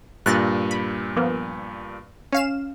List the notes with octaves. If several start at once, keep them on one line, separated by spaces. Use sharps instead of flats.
G2 A#2 F#6 A6 A#6
B5
F3 A#3 B3
C#4 F5 E7